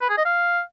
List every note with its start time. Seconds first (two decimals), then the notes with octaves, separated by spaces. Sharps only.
0.02 B4
0.10 G#4
0.17 D#5
0.25 F5